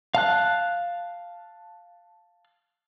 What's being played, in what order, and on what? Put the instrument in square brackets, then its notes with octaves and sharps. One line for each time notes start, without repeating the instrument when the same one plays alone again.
[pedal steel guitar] F5 A5 F#6